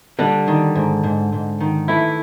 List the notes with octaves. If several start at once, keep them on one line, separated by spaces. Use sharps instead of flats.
D3 G3 D4
D#3
G#2
G#2
G#2
D#3
E3 A3 E4